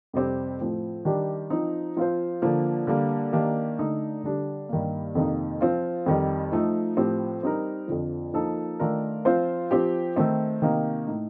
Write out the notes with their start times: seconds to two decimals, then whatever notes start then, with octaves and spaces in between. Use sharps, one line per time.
0.13 F2 C3 G3 C4 G4
0.60 A2 F3 C4
1.05 D#3 G3 D4 G4
1.50 F3 C4 D#4
1.97 F3 C4 F4 C5
2.42 D3 F3 A#3
2.87 D3 G3 A#3
3.33 D#3 A#3 D4 G4
3.79 D3 A3 D#4
4.23 D3 G3 D4 G4
4.69 G2 D#3 G3 A#3
5.15 F2 C3 D#3 A#3 D#4
5.61 F3 C4 F4
6.06 F2 D#3 G3
6.52 F3 A3 D#4
6.97 A2 F3 C4 G4
7.43 G3 C4 D#4 A#4
7.88 F2 D3 F3
8.34 F3 A#3 D#4 A4
8.80 D#3 A3 D4 F4 A#4
9.25 F3 C4 F4 C5
9.71 F3 C4 G4
10.16 D#3 A3 C4
10.62 C3 D#3 A#3 D#4
11.07 A2 A3 D#4